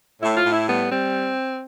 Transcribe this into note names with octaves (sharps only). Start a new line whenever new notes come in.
A2 E4
F4
A2
E4
G3 B3
G3 C4